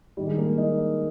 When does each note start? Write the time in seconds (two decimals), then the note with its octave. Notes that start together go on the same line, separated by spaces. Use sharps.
0.17 G2 D#3 G3
0.27 G#3
0.38 A#3
0.58 D#4